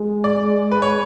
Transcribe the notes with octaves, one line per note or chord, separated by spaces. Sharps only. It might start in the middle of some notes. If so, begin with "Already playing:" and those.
Already playing: G#3
D5
B4
C#5